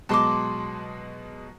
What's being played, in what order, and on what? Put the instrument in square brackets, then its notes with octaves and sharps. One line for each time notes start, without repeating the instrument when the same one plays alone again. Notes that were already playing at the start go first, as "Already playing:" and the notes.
[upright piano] B2 F#3 G#3 [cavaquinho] A5 C6 D6